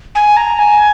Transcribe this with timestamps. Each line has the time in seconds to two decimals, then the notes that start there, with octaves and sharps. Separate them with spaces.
0.15 G#5
0.37 A#5
0.59 G#5